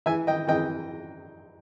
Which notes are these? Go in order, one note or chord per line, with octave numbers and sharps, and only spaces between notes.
E3 E5 G#5
D#5 G5
E3 D#5 G5